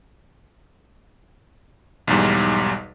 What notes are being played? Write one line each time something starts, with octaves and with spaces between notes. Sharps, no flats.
B1 E2 G#2 G3